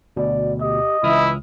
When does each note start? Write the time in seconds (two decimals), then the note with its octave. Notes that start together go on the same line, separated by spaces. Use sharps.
0.16 D2 B2 D5
0.61 G4 D#5
1.03 C#2 E3 E4 D#6 F6